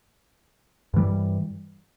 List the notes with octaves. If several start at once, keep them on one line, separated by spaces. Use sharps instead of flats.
G2 E3 G3